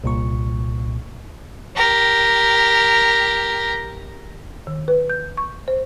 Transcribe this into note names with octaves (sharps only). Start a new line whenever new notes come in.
C2 A#2 C#6
G4 A#4
D#3
B4
G6
C#6
C5